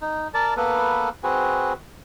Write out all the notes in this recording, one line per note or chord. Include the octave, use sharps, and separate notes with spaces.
D#4
A#4 D5 A5
A#3 B3 A4 B4
C4 F#4 G#4 B4